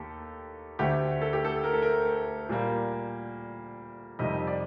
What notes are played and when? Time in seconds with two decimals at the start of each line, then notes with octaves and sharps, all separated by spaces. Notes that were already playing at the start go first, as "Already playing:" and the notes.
Already playing: D#2 A#3 G4 A4
0.79 D2 D3 A3 G4
1.21 A4
1.33 G4
1.45 A4
1.64 A#4
1.73 A4
1.82 A#4
2.49 A#2 G3 A#3
4.19 F2 C3 D#3 G3 D#5
4.47 D5